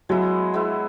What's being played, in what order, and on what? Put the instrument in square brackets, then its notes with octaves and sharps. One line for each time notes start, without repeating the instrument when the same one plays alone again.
[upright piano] F#3 [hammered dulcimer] G#3 B3 E4
[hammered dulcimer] G#3 B3 E4